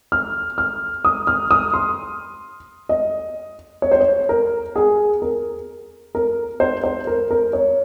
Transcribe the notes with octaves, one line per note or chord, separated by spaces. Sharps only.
F6
F6
D#6
F6
D#6
C6
D#5
C#5
C5
C#5
A#4
G#4
A#4
A#4
C5
C5
A#4
A#4
C#5